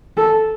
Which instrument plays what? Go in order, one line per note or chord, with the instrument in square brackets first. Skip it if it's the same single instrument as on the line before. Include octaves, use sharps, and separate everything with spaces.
[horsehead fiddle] A4